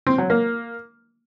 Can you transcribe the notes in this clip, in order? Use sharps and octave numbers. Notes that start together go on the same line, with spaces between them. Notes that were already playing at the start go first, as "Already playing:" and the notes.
C4
F#3
A#3